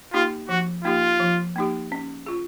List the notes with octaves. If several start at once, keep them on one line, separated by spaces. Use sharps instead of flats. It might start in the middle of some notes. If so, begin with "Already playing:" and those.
A#3 D#4 F4 G4
F3 F#4
A#3 D#4 F4 G4
F3
A#3 D#4 G4
C#4
F4 G#4